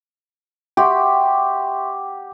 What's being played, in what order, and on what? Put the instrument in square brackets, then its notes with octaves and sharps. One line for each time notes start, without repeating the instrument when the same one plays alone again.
[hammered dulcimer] G4 [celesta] E5 C6 C#6 [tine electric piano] F#5 G5